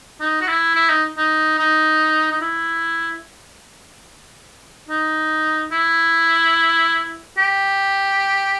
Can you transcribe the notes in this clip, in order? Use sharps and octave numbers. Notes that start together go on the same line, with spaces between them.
D#4
F#4
E4
E4
D#4
D#4
D#4
D#4
E4
D#4
E4
G4